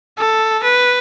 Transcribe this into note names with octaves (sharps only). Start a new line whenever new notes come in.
A4
B4